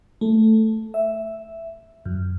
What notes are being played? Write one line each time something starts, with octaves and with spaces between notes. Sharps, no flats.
A3
E5
F#2